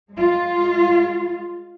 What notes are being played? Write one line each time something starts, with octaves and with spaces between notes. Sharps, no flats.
G#3 F4